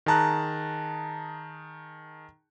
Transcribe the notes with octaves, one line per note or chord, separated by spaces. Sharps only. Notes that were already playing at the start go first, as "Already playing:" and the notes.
D#3 G#4 A5 A#5 F#6